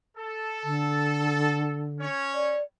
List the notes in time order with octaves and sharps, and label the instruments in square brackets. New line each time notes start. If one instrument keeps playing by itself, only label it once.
[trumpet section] A4
[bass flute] D3
[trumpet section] C#4 C#5
[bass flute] D5